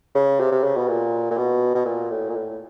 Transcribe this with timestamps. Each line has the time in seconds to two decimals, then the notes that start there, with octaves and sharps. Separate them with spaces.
0.15 C#3
0.40 C3
0.52 C3
0.64 C#3
0.77 B2
0.88 A#2
1.31 A#2
1.37 B2
1.75 B2
1.85 A#2
2.10 A2
2.29 A#2
2.35 A2